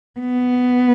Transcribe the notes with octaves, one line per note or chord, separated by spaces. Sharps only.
B3